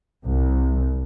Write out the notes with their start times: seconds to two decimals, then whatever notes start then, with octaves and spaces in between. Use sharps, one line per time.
0.24 C2